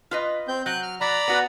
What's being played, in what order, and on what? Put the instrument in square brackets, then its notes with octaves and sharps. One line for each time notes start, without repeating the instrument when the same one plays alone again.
[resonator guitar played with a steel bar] F4 B4 D#5
[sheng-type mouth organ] C4 G6
[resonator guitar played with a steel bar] F#3 [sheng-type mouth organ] F#6 G6
[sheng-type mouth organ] F6
[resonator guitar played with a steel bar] F#3 [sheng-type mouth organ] D5 A#5 B5
[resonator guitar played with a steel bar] B3 F#4 B4